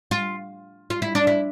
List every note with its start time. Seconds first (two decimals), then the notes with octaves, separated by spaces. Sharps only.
0.11 F4
0.90 F4
1.02 E4
1.15 D4
1.27 E4